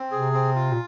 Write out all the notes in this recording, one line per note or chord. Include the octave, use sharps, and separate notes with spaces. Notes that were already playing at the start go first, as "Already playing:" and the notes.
Already playing: C4
C3 G#4
C4
F4
A#2